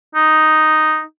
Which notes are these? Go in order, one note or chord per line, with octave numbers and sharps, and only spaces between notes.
D#4